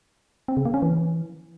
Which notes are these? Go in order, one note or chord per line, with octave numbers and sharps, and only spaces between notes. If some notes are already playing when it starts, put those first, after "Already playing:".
C4
C#3
A#3
C#4
E3